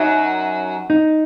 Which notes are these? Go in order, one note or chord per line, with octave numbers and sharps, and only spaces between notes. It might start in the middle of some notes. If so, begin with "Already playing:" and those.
Already playing: F#2 F#3 D#4
D#4